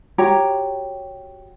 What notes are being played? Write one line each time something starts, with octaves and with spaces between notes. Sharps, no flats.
F#4 G4 C#5 A#5